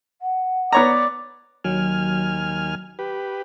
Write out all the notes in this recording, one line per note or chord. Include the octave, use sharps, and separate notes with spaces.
F#5
B3 C#5 D5 A#5
D#2 F#3 G#5 F6
G4 B4